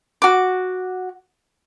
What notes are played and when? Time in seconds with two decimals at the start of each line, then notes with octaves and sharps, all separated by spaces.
0.22 F#4 D6